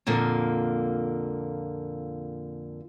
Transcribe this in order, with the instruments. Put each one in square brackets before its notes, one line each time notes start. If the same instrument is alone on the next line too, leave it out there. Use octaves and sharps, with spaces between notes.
[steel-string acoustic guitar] F2 A#2 D3 A#3